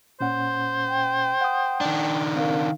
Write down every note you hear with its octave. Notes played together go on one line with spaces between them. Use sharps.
A#2 C#4 C5 F#5
G5
F#5 D#6
D#3 D4
C4 A#4 F5